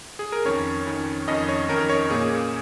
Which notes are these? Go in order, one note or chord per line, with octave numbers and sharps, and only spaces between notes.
G#4
A#4
F2 D#3 C#4 C#5
F2 D#3 C#4
F2 D#3 C#4 D#5
C#5
F2 D#3 C#4 A#4
A#4
C#5
A#2 A#3 C#4 G#4